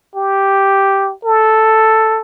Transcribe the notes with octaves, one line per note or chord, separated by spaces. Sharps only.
G4
A4